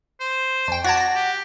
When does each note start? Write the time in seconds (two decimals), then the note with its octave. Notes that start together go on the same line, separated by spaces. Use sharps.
0.20 C5
0.68 F2 G5
0.84 F#4 D5 A5 G#6 A#6
0.97 A#6
1.15 G4